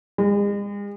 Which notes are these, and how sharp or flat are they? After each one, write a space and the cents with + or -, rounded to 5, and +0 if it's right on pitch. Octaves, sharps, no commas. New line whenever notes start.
G#3 -40